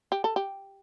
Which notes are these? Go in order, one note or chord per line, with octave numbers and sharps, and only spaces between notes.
G4
A4
G4